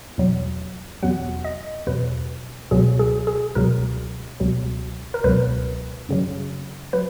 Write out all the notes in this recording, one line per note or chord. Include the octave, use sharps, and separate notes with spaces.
E2 B2 F#3
E2 B2 F#3 F#5
D#5
E2 B2 F#3 B4
C#2 B2 F#3 G#4
G#4
G#4
C#2 B2 F#3 A#4
C#2 B2 F#3
A#4
C#2 B2 F#3 B4
F#2 C#3 F#3
F#3 B4